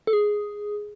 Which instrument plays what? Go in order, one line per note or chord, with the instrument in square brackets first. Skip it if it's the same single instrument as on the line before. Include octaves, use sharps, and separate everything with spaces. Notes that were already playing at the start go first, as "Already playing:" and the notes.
[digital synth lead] A4
G#4